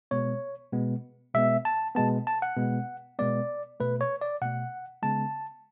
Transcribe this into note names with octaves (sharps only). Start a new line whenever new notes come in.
B2 G#3 B3 C#5
B2 G#3 B3
B2 G#3 B3 E5
A5
B2 G#3 B3 A5
A5
F#5
B2 G#3 B3
B2 G#3 B3 D5
B2 A3 B4
C#5
D5
B2 A3 F#5
C#3 G#3 B3 A5